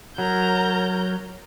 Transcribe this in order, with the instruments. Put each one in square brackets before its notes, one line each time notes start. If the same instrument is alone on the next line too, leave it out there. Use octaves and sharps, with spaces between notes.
[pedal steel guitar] F#3 [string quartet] A#4 A#5 G6